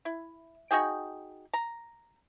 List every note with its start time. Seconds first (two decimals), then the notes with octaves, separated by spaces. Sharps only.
0.05 E4
0.71 D#4 F#4 G#4 G5
1.53 A#5